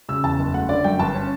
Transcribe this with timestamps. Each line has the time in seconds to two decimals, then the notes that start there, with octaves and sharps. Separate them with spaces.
0.09 C#3 E6
0.24 E2 A5
0.39 F#1
0.54 A3 F#5
0.69 D3 D5
0.84 F#2 G5
0.99 G1 A5
1.14 C#4